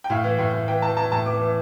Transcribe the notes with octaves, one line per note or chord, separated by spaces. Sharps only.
G5
A2 F5
E3
A2
A2
E3 G5
E3 A5
E3 A5
A2 A5
E3 D6
E3